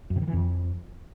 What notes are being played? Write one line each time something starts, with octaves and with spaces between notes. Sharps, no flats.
F#2
C3
D#3
E3
F2